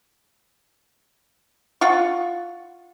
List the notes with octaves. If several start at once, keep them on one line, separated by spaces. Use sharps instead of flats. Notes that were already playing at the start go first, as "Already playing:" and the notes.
F4 F#5 C#6